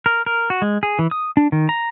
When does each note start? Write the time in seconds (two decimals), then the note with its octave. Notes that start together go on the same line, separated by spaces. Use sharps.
0.06 A#4
0.26 A#4
0.50 F#4
0.62 G#3
0.83 G#4
0.99 E3
1.11 D#6
1.37 D4
1.52 D#3
1.69 A#5